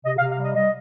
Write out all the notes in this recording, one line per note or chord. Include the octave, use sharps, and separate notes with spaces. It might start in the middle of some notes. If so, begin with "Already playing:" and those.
C3 D#5
F5
C3
F5
G3
D#5
G3 D#5